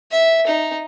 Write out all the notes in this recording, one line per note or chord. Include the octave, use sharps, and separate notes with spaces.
E5
D#4